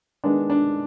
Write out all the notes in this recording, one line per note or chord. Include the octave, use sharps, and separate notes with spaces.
D#3 G#3 B3 D4
D4